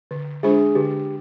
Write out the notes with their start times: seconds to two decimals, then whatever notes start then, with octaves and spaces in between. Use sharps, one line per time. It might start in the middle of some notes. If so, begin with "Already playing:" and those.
0.11 D3
0.43 G#3 D4 F4 G#4 C5
0.75 D3 G4